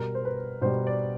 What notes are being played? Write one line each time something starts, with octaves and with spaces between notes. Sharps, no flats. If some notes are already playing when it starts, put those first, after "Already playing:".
Already playing: B2 G3 A#4
C5
B4
B2 G3 C5
D5